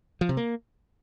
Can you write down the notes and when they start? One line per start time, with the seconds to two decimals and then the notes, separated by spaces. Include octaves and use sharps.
0.21 F3
0.29 C3
0.37 A#3